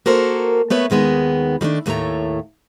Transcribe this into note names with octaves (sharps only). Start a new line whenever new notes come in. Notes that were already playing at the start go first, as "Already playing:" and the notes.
A#3 F#4 A4 A#4 C5
A3 B3 B4 C#5
D#2 D#3 G#3 B3
D#3 G3 A3 D4
D#2 A2 A3 C#5 A#5